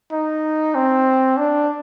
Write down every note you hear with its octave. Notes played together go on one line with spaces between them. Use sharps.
D#4
C4
D4